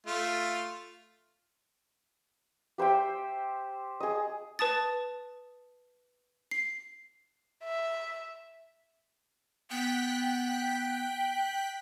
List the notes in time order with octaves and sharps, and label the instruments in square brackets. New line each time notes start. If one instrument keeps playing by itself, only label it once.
[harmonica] A3 F4
[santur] G4 C5 E5 G5
G#4 D#5
[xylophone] B4 A5 D#6 A6
C7
[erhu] E5
[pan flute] B3 [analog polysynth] G5 F#6 B6